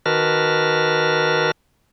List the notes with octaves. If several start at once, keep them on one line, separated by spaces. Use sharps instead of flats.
D#3 F#4 A#4 B4 A5 F6